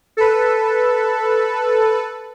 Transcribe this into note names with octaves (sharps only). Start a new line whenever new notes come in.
A4 B4